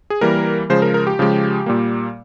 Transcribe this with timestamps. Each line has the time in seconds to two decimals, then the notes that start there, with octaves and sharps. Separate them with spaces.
0.10 G#4
0.21 E3 G3 A#3 A#4
0.70 C#3 F3 G#3 C5
0.82 A#4
0.94 A#4
1.07 G4
1.19 C#3 F3 G#3
1.66 A#2 G3 A#3